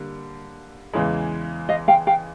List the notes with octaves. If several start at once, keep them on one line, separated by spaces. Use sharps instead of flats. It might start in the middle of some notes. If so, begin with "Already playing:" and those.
Already playing: D3 G3 A#3
E2 C#3 E3 G#3
D#5 F5
F5 G5
F5 G5